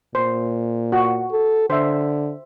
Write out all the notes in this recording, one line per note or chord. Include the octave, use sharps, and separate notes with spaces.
A#2 C5
F#4
A4
D3 C5 E5